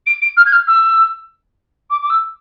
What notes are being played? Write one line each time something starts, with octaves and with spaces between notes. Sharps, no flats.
D7
D7
F6
G#6
F6
E6
D6
D6
E6